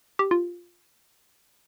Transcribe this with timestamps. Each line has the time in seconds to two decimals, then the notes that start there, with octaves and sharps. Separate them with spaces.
0.19 G4
0.31 F4